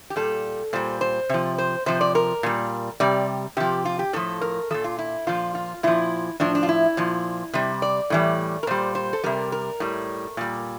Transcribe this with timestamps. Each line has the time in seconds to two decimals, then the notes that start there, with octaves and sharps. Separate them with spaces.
0.10 G4
0.16 A#2 G3 A4
0.73 A#2 G3 C5
1.01 C5
1.29 C3 F3
1.58 C5
1.86 C3 F3 C5
2.01 D5
2.15 A#4
2.43 A#2 G3
3.00 C3 G3 D5
3.57 C3 F3 G4
3.85 F4
3.99 G4
4.13 A2 F3 A4
4.41 A#4
4.71 A#2 F3 A4
4.84 F4
4.99 E4
5.27 A#2 F3 F4
5.55 F4
5.83 A#2 F3 E4
6.40 A2 F3 D4
6.55 D4
6.63 F4
6.69 E4
6.97 A#2 F3
7.54 C3 G3
7.82 D5
8.10 A2 E3 G3
8.63 A#4
8.67 A#2 G3 C5
8.95 C5
9.13 A4
9.24 C3 G3 A#4
9.52 A#4
9.80 A2 G3
10.37 A#2 G3